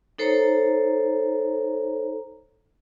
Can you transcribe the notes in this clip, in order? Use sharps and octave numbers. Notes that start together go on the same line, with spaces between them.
D#4 A4 C5 C#5 A#5